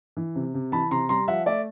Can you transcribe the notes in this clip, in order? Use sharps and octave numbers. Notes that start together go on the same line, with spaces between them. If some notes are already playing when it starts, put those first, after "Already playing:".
E3
C3
C3
E3 A5 B5
C3 A#5 C6
G3 A#5 C6
F3 E5 F#5
A3 D5 E5